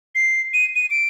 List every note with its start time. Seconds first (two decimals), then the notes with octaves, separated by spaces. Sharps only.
0.15 C7
0.54 D#7
0.75 D#7
0.91 D7